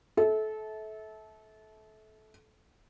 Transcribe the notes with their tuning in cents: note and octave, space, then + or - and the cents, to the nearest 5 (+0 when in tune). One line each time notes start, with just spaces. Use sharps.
A4 -25 E5 -30